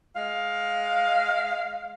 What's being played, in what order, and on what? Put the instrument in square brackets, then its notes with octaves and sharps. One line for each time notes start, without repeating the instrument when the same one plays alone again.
[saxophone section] G#3 F5